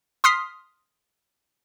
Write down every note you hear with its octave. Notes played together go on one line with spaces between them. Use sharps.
C6 D#6 F6 B6 C7